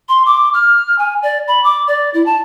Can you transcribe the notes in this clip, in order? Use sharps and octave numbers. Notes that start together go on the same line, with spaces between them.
C6
D6
F6
G#5
D5
B5
D6
D5
E4
A5